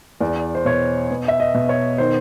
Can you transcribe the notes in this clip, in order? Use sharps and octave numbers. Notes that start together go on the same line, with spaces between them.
E2 D5
C5
B2 C#5
B3
E5
D#5
B2
C#5
D#3 C5